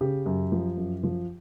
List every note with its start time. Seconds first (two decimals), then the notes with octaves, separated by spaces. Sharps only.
0.01 C#3 G4
0.26 F#2
0.52 F3
0.77 F#2
1.03 F3